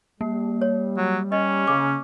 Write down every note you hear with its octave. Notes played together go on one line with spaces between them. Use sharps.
G3 A#3
C#5
F#3
C#4 D#5
C#3 D6